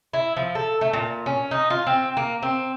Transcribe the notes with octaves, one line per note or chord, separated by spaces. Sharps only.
E4
F3
A4
A3
A#2
C#4
D#4
F4
C4
A#3
C4